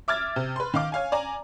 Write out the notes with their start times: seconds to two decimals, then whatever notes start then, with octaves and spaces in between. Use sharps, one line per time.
0.08 E5 D6 F6 G#6 A6
0.36 C3
0.56 B4 C6
0.74 D#3 F5 D6
0.92 C#5 F5 G#5
1.12 D5 G#5 A#5